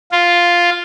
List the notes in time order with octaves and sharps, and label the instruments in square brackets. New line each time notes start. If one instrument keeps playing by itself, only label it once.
[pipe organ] F4